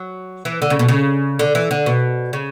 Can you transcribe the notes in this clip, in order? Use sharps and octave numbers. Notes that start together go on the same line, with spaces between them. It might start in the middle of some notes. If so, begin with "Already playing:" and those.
Already playing: F#3
E3
D3
C#3
B2
C#3
D3
E3
D3
B2
C#3